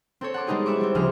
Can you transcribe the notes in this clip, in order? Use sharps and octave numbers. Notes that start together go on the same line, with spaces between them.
C4 A4 C#5
F#5 A5 D6
G3 G#3 B3 D#4 G4 G#4
E4 E5 C#6 D6
G3 C4
D2 C#3 F3 G#4 F6